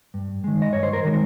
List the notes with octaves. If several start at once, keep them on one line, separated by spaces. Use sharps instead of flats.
G2
D#3 G#3
D#5
G2 C#5
C5
A#4
D#3 G#3